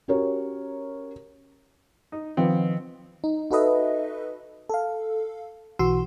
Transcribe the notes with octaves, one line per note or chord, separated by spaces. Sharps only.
C#4 F#4 G4 A#4 C#5
D#4
D#3 F3 B3 C4
D#4
D#4 F#4 A4 B4 D#5 E5
A4 F5
B1 E3 F#4 C6 E6